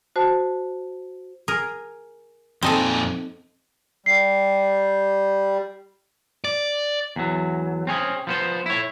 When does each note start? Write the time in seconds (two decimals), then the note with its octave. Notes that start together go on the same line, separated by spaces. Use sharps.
0.16 F#4 C5 A5
1.48 G#4 A#4
2.63 F2 A#2 C4 D#4 A4 G#5
4.06 G3 C7
6.44 D5
7.16 E2 F#3
7.87 C4 C#4 G#4
8.27 F3 B3 C5
8.66 E4 C#5